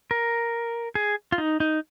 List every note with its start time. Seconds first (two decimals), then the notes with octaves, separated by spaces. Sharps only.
0.11 A#4
0.95 G#4
1.32 F4
1.38 D#4
1.60 D#4